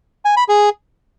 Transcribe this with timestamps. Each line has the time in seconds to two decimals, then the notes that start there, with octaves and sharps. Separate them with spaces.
0.25 G#5
0.37 B5
0.48 G#4